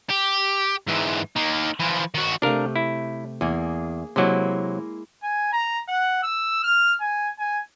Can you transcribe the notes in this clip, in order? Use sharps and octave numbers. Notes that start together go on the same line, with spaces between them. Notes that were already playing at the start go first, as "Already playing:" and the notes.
G4
G#2 E3
D#3 A#3
E3 F3
D#3 F#4
C3 A3 D4 A#4 F5
E4
E2 A#3 G#4
C3 F#3 G#3 A#3 E4
G#5
A#5
F#5
E6
F6
G#5
G#5